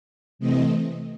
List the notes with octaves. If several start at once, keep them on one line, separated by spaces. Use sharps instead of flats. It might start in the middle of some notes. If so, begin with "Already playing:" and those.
C3 E3 A3 C4 D#5